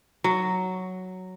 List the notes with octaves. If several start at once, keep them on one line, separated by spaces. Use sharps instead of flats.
F#3